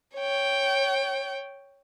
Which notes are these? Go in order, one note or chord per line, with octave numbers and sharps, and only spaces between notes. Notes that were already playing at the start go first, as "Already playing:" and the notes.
C#5 G5